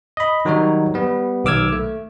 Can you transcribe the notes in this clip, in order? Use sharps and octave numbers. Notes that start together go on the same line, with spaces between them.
D#5 B5
D#3 F#3 G3 D#4 F#4 C#5
G3 B3
B1 D#3 D6 E6 F6 G#6
A3